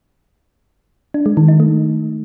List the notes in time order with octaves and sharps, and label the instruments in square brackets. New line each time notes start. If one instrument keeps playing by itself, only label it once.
[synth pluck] D4
G#3
D#3
D#4
A3